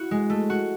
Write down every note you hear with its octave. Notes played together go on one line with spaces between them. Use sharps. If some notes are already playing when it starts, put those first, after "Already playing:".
Already playing: E4 F#4
G#3
A3
F#4